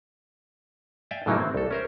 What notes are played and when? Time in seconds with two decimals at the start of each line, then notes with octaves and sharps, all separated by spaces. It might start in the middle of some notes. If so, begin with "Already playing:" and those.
1.11 D5 E5 F5 G5 G#5
1.26 A2 C#3 E3 F#3 A#3 D#4
1.38 C4
1.54 C2 A4
1.71 C#4 A#4 C5